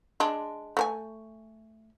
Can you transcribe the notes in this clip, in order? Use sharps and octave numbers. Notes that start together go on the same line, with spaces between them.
G#3 D4
A3 A#4 G#5